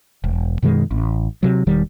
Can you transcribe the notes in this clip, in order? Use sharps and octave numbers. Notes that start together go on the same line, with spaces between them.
E1
F#2 B2 D#3 G#3
A1
C3 F#3
E1 D#3 G3